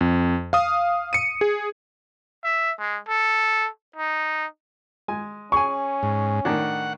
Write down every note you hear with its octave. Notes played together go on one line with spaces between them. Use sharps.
F2
F5 D#6
C#7 D#7
G#4
E5
G#3
A4
D#4
G#3 G#5
C#4 G#4 G#5 C#6
G#2
A2 D#3 D4 F#5